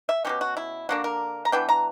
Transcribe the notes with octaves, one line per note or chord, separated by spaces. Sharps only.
E5
B2 F#3 C#4 G4
F#4
E4
D3 A#3 D4 F#4
A#4
A#5
E3 B3 D4 G5
A#5